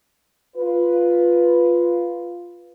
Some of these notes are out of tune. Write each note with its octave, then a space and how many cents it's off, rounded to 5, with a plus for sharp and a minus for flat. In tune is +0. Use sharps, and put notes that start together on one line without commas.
F4 +0 B4 +0